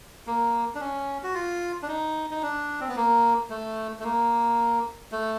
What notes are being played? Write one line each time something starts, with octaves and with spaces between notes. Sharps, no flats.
A#3
D4
C#4
F#4
F4
D4
D#4
D#4
D4
C4
B3
A#3
A3
A3
A#3
A3